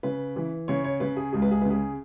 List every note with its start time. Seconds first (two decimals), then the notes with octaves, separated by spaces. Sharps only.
0.03 C#3 B4
0.36 E3
0.68 C#3 C#5
0.84 C#5
1.00 C#3 B4
1.17 G#4
1.33 C#2 G#4
1.42 B4
1.51 G#4
1.62 C#3 B4
1.70 G#4